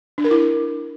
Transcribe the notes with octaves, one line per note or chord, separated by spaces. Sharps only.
D4
A#4
E4